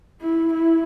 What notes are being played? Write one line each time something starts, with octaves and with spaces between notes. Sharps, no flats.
E4
E4